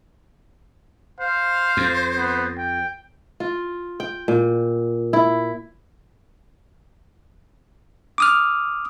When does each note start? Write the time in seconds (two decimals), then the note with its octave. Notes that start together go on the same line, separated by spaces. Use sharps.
1.20 C5 F5
1.77 F2
2.17 B3
2.58 G5
3.40 F4
4.00 G5
4.28 A#2
5.13 E4
8.18 D6 D#6 F6